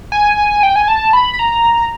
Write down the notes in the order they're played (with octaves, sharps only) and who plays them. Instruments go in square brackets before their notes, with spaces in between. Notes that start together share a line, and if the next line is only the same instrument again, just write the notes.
[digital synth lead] G#5
G5
G#5
A5
B5
B5
A#5